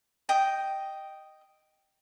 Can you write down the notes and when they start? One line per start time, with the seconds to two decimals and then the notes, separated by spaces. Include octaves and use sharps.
0.29 D#5 G5 D#6